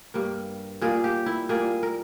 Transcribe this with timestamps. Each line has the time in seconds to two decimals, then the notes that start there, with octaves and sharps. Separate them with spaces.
0.14 G2 G3 A#3
0.81 A#2 G3 A#3 G#4
1.04 G4
1.26 E4
1.49 A#2 G3 A#3 G#4
1.83 A#4